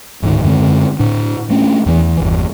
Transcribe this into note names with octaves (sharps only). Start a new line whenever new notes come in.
D1 G#2 D3 D#3
F#2 D3 G#3 C4
A2 D4
A3 C#4 D4
E2 E3
G1 E2